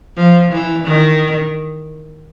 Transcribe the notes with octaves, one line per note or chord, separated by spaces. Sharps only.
F3
E3
D#3